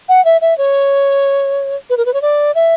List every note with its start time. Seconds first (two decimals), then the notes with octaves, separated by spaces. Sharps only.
0.09 F#5
0.25 E5
0.41 E5
0.58 C#5
1.90 B4
1.97 A#4
2.06 B4
2.14 C#5
2.22 D5
2.55 E5